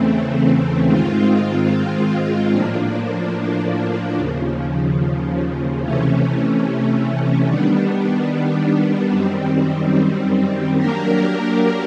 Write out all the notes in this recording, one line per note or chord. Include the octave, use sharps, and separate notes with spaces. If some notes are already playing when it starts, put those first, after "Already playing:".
Already playing: E2 C#3 E3 A3 C4
G#2 D#3 G#3 C4 F4
A2 F3 A#3 D4
D#2 C#3 F3
C3 E3 A3 C#4
D#3 G3 B3 D4
F#2 D#3 G3 C4
F#3 A#3 D4 G4 A#4